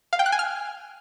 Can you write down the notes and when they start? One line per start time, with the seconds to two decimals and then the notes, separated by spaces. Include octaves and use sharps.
0.13 F5
0.19 G5
0.26 F#6
0.32 G#5
0.39 F6